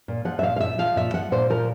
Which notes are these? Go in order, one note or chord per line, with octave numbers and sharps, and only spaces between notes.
A#2
F3 F#5
E5
A#2 F5
F5
F3 E5
F3 F5
A#2 E5
F3 F#5
A#2 C5
F3 A#4